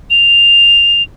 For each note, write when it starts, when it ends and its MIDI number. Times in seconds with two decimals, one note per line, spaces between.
0.10 1.03 101